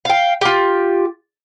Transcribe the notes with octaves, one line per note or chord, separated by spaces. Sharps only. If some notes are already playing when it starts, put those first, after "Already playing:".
F5 G5
F4 G4